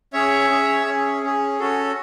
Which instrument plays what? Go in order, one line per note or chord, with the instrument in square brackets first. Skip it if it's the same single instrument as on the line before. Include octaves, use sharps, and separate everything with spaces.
[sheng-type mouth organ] C#4 G#4 C#5 E5
C#4 G#4
C#4 G#4
C#4 G#4
C#4 F#4 A4